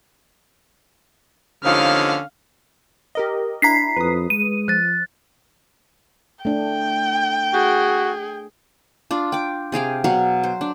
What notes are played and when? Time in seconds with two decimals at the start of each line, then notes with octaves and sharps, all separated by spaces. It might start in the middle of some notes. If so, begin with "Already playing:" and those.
1.64 D#2 D3 F3 C#4 D#4 C#5 F5 F6
3.15 G4 A#4 D#5
3.62 D4 E4 A#5 B6 C7
3.96 F2 B4 D#6
4.30 G#3 D#7
4.68 F3 F#6 A6
6.45 A3 D4 G5
7.54 F#4 G#4
9.11 D4 F4
9.32 G5 D6
9.72 C3 G#4 F5 G5
10.04 B2 F#3 F5 F#5
10.44 C5
10.61 D4